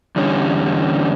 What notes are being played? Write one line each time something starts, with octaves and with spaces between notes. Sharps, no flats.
E2 D3 G3 C#4